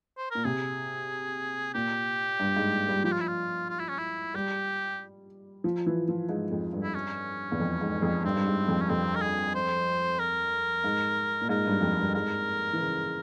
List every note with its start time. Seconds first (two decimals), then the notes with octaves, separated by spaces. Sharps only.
0.18 C5
0.31 A#2 A#4
0.45 C3 G#4
1.74 A#2 G4
2.40 G2
2.56 G#2
2.89 G3
3.04 F3 G4
3.12 F4
3.20 E4
3.28 F4
3.69 F4
3.79 E4
3.88 C#4
3.98 E4
4.34 G3 G4
5.64 F3
5.86 E3
6.08 F3
6.29 G#2
6.51 F2
6.73 G2
6.83 E4
6.94 C#4
7.52 E2
7.60 F2
7.81 G#2
8.02 F2
8.24 G2 C4
8.36 G2
8.46 G#2
8.68 F2
8.81 C#4
8.90 F2 C4
9.15 A#4
9.22 G#4
9.54 C5
10.19 A#4
10.84 G#2
11.41 A#2
11.49 G#2 A#4
11.66 G2
11.81 F2
11.98 G2
12.14 G#2 A#4
12.73 E3
12.80 C#3